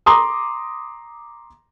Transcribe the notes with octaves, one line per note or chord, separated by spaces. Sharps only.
A#5 C6 D6 D#6